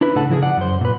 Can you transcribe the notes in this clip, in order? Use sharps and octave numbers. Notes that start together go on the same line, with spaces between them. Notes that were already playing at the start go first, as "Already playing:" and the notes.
D4 E4 B4
A2 C#3 A4 B4 F#5 A5
C#3 F3 E4 G4 G#4
D5 F#5
F#2 C5
A#2 B4